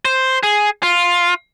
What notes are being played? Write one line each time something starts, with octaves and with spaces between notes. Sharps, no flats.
C5
G#4
F4